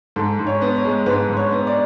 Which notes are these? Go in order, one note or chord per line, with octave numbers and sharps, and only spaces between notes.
G#2 A4
G#2
C#5
B3
C#5
G#3
G#2 B4
G#2
C#5
B3
D5